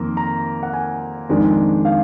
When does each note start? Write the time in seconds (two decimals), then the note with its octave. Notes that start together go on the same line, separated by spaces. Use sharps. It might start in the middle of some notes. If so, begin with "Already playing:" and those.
Already playing: F2 D#3 A#3
0.17 A#5
0.63 F#5
0.73 G#5
1.29 F2 D#3 G#3 D4
1.85 F5